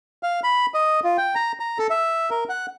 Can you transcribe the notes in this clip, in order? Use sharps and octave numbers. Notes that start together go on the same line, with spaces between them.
F5
B5
D#5
F4
G5
A#5
A#5
A4
E5
A#4
F#5